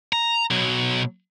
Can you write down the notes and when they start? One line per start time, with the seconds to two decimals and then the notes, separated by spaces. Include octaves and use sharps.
0.13 A#5
0.51 B2 F#3